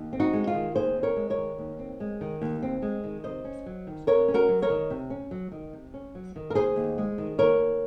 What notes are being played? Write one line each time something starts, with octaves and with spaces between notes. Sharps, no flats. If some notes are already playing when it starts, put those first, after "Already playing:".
Already playing: D#2
C4
D#4 F#4
G#3
F4
D#3
D#2 G#4 C5
C4
A#4 C#5
G#3
A#4 C#5
D#3
D#2
C4
G#3
D#3
D#2
C4
G#3
D#3
C3 C5 D#5
C#4
F#3
D#3
C3 A#4 C#5
C#4
F#4 A#4
F#3
A#4 C#5
D#3
C3
C#4
F#3
D#3
C3
C#4
F#3
D#3
A#4
D#2 G#4 C5
D#2
G#3
D#3
D#2 A#4 C#5
D#2